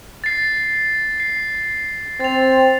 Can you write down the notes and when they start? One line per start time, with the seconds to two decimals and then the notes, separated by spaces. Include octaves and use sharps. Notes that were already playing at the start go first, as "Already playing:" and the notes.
0.24 A6 C7
1.20 C7
2.20 C4 A6 F7